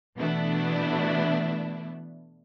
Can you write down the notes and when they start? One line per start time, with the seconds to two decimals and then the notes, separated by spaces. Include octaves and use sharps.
0.18 B2 E3 A3 B3 D4 E4